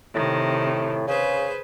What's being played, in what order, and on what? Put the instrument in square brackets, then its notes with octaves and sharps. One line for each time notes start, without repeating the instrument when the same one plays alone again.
[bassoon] A2 [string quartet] C3 D#3
[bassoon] C#3 [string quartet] G#4 B4 C5